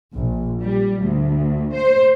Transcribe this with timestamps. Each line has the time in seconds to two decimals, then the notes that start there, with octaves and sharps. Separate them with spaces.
0.14 A#1
0.61 G3
1.03 D2
1.73 C5